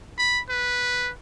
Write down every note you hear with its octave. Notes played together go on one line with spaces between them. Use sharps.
B5
B4